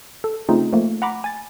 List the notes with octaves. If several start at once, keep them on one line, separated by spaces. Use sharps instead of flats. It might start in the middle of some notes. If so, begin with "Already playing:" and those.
A4
C#3 A3 C4 D#4 F4
F3 A3 A#3
F#5 A#5 B5 D6
G#5 A6